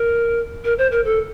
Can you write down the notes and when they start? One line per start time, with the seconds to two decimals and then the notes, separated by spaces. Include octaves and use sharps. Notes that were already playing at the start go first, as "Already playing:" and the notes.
Already playing: A#4
0.64 A#4
0.78 C5
0.92 A#4
1.05 A4